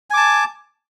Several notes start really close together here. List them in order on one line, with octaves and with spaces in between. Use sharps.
G#5 D6 A5